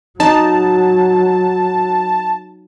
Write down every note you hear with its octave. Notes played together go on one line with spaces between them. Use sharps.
F#3 D#4 A5